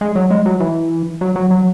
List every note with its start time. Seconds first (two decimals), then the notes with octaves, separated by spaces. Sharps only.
0.01 G#3
0.15 F#3
0.31 G#3
0.46 F#3
0.60 E3
1.21 F#3
1.36 F#3
1.51 F#3